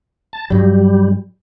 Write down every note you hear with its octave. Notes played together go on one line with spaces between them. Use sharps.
A5
G2 F#3 G3